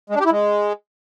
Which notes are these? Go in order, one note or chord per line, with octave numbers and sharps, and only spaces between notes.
G#3
D4
G4
E4
G#3